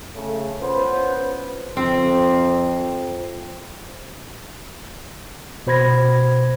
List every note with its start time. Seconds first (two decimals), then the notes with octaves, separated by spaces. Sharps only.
0.16 C#3 A3
0.61 B3 C#4 F4 B4 C5
1.77 F2 C4
5.67 B2 C5 B5 G#6 A#6